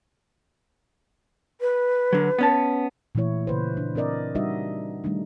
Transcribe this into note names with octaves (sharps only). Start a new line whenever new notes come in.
B4
D3 F#3
B3 C#4 A5
A#2 E3 A3 E4 C#5
C#3 B4 C5
D4
C4 D4 A#4 D5 D#5
G3 D4 D#4 F#4 D#5 E5
D#3 G3 A3 D4 D#4